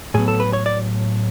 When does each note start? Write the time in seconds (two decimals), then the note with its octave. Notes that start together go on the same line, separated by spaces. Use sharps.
0.14 A2 F#3 B3 G#4
0.28 A4
0.40 B4
0.53 C#5
0.66 D5